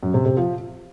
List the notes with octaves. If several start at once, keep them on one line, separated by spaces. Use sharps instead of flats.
F#2
C3
C3
F3